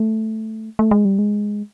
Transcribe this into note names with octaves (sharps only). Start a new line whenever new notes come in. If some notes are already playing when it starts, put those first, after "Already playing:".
Already playing: A3
A3
G#3
G3
G#3